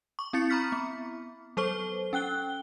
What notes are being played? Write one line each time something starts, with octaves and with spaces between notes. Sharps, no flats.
C#6 D6
C4 E4 A6 C#7
A#5 B5 C#6 F6 B6
B3
F#3 A4 C5 C#6 G7
C#4 G5 F#6 G7